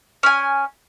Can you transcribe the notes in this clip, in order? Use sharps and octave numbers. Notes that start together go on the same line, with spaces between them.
C#4 G#5